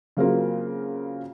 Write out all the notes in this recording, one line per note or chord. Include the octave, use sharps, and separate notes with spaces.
C#3 F#3 A#3 C4 F4 A#4